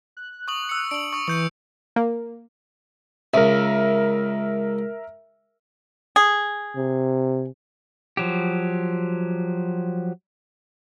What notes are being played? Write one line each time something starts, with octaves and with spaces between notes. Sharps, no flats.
F#6
C#6 D#6 F#7
E6 C#7
D4 D7 F#7
C#6 D#6
E3 C#6 G6 C#7
A#3
C#2 A#4 E5
G#4
C3
F3 F#3 G4